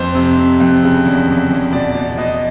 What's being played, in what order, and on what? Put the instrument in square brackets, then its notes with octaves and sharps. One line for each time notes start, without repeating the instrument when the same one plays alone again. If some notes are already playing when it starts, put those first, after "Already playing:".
Already playing: [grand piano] F2 C5
C3
C3
F2
C#3
E2
E2
E2
B2 D5
B2
B2 D#5